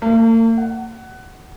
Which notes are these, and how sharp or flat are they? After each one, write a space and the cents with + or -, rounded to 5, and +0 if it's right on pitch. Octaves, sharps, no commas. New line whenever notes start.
A#3 -45
F#5 +20